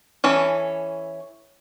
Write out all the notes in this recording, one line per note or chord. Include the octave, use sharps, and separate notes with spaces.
E3 C#4 A4